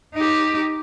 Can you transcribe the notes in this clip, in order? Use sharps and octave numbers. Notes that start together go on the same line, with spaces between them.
D#4 G4